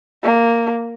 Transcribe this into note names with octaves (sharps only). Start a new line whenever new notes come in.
A#3